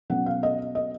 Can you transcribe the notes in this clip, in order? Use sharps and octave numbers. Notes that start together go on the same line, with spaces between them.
B2 F#3 C#4 F#5
F5
D#5
D#5